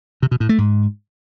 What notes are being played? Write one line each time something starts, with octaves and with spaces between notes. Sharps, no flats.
C3
B2
A2
A3
G#2